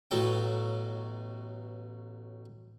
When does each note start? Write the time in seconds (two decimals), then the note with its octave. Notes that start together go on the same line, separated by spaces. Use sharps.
0.11 A1 B2 F#3 A4 G5